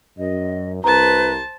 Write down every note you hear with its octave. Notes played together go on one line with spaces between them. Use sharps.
F#2 D#5
C2 B4 C5 A5 A#5